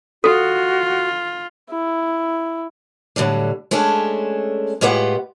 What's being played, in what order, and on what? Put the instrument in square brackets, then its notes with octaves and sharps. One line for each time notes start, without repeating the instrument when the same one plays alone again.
[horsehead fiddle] F4 [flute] F#4 [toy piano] A4
[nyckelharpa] E4
[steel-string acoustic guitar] A2 D3 F#3 G3
G#3 A3 C#4 D4 A4
A2 G#3 F4 G4 B4 F#5